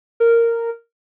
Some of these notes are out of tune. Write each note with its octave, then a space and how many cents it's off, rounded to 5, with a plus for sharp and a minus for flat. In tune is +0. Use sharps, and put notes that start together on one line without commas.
A#4 -10